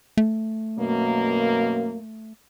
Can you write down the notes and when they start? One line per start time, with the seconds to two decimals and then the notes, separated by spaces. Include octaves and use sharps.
0.17 A3
0.78 F#2 B2 A#3